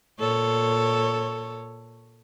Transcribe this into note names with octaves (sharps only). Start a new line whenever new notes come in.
A#2 A4 C#5